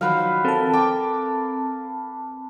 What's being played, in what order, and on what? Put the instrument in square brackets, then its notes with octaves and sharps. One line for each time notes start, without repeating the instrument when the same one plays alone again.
[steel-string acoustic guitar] D#3 F3 F#3 [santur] B4 F5
[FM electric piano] C4 A5 [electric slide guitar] A4 A#4
[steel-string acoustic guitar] G5 [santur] D6